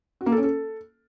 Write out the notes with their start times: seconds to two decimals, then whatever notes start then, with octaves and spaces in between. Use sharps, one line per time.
0.21 F#4
0.26 A#3
0.32 A4
0.38 C#4
0.43 A4